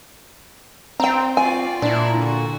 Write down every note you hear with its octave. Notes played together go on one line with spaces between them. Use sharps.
C4 G5 A#5
F4 F#4 D5 G#5
A#2 D4 E4
D3 F#4